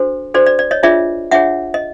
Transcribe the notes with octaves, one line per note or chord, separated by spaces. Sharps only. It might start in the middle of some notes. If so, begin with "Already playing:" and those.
Already playing: D4 F#4 A4 C5
D4 F#4 A4 C5 D5
D5
D5
C#5 D#5
D4 F4 G#4 C#5 D5 E5
D4 F4 G#4 C#5 E5 F#5
D#5